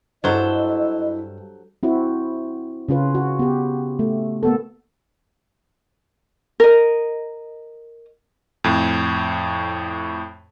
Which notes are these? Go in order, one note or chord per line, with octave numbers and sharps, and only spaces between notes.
G2 F#3 E4 A4 C5 D#5
C4 E4 F#4
C#3 C#4 F4 B4
F#4
B3 G4
A3
A#3 B3 A4
A#4 D#5
F2 A2